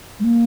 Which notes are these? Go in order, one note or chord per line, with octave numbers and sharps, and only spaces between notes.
G#3
A#3